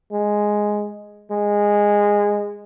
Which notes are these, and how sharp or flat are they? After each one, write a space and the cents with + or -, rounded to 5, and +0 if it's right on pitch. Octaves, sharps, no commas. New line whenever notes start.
G#3 +0
G#3 -15